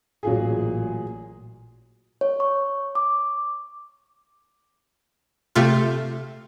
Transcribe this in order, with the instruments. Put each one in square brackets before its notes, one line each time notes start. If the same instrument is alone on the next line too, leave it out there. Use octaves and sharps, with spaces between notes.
[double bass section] A1 A#2 [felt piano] F#3 F4 G#4
[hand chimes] C#5
C#6
D6
[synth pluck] C3 A3 F4